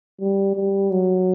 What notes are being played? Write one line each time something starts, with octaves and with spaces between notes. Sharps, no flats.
G3
G3
F#3